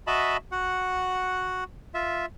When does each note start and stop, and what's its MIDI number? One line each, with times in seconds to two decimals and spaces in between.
0.07 0.37 66
0.07 0.37 75
0.07 0.37 76
0.07 0.37 81
0.07 0.37 83
0.52 1.64 66
0.52 1.64 78
1.94 2.26 65
1.94 2.26 76